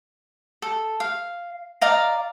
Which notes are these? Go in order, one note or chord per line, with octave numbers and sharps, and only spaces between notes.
A4
F5
D5 D#5 F5 A#5